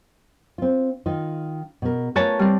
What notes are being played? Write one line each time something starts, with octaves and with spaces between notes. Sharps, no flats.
C4 F4
D#3 D#4 F4
B2 A#4
A3 F4 A#4 B4 C#5 A5
G3 C4